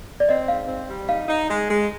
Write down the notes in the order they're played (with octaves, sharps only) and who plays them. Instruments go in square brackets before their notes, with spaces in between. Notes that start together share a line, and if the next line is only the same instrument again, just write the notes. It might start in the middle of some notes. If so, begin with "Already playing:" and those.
[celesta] D5
[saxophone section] C4 [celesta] D#5
[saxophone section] G#2 [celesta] F5
[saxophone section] C4
G3
[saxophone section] D#4 [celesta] F5
[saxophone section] D#4
G#3
G#3